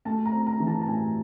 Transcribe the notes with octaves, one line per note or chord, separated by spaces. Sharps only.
A3 A5
A#5
C4
A#5
E3
A5
A5
A2 G#5